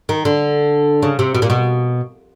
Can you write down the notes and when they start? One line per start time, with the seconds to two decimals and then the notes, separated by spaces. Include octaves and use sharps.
0.09 D#3
0.25 D3
1.02 C#3
1.19 C3
1.35 B2
1.42 A#2
1.50 B2